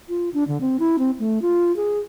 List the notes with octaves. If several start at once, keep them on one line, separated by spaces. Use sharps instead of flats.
F4
D4
D3
C4
E4
C4
A3
F4
G#4